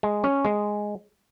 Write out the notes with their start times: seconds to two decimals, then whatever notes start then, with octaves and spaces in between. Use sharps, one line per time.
0.03 G#3
0.24 C#4
0.45 G#3